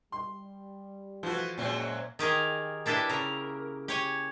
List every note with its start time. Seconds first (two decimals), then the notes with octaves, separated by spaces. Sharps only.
0.12 G3 C6
1.23 E3 F3 A3 F#4
1.58 F#2 A#2 F#3 G#3 C4
2.19 D#3 G4 G#4 A#4
2.86 A#3 D4 E4 G4 B4
3.09 C#3 A#4
3.88 G4 C#5 G#5